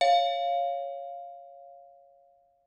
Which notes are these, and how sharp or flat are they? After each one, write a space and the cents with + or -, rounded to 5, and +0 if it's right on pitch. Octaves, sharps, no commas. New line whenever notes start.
C#5 +0 F5 +0